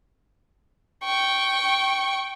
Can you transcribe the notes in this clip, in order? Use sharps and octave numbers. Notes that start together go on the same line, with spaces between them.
G5 C#6